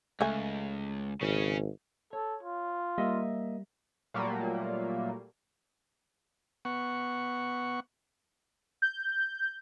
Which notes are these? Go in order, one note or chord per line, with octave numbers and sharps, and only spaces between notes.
C#2 A3 G#5
G#1 C#3 C#4
A4 C#5
F4
G3 A#3 D#5 E5
A#2 F#3 G3 A3 A#3
B3 F#5 C#6
G6